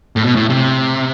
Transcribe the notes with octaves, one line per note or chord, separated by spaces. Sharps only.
A2
B2
A2
C3